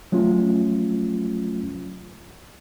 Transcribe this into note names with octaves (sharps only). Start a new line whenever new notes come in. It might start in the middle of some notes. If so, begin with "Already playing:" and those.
F#3 A3 C#4 F4